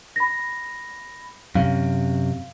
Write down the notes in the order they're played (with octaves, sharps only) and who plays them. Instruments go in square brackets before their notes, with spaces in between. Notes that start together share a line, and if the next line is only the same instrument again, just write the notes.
[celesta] B5 A#6
[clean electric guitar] F#2 C3 [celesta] F5